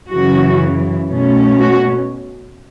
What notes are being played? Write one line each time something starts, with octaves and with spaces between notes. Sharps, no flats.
F#2 C#3 E3 F#4
B2 A3 C#4
F#4